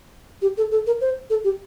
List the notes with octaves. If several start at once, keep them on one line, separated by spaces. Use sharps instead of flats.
G4
A4
A4
A#4
C5
A4
G4